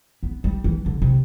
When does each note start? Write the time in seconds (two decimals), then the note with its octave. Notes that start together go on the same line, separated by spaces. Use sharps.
0.23 B3
0.44 G3
0.64 E3
0.86 D3
1.02 C3